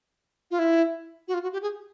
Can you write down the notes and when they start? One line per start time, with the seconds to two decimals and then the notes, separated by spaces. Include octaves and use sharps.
0.51 F4
0.59 E4
1.28 F#4
1.34 F4
1.43 F#4
1.53 G4
1.62 G#4